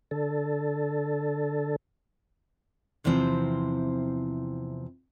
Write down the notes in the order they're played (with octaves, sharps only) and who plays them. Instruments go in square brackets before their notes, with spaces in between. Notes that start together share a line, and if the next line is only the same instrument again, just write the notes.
[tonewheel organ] D3 A4
[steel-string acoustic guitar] E2 C3 E3 F3 C4